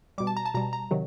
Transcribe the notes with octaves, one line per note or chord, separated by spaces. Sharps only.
B2 G3 D6
A5
A#5
A5
B2 G3 A#5
A#5
C3 D#3 F#3